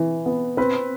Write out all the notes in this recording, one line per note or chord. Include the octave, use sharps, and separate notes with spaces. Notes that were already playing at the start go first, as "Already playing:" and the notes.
Already playing: E3
B3
C4 B4